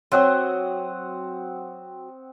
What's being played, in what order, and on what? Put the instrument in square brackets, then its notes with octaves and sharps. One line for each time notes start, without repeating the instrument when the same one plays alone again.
[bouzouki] F#3 [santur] C4 F#5 D#6